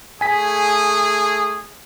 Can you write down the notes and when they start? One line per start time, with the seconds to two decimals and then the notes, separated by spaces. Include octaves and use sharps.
0.21 A3 G#4 G#5 B6